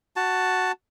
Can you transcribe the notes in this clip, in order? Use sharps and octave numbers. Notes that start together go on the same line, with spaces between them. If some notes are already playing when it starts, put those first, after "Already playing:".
F#4 A5